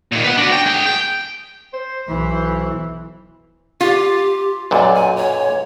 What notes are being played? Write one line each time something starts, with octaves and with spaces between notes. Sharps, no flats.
A#2 D#3
B4 F#5
D4 F#4
G5
G#4 G5
G5
C5
B1 E3
F4 G4
B1 F#2 A#2 D5
G#5
C#5